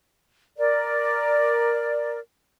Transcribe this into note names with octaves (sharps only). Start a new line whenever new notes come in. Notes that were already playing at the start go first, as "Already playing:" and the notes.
A#4 D5